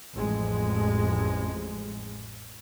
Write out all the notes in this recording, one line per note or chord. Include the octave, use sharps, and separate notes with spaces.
A1 F2 G#3